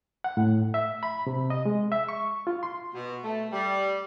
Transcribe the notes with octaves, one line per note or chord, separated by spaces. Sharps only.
F#5
A2
E5
B5
C3
D#5
G#3
E5
C#6
F4
C6
B2
A3
G3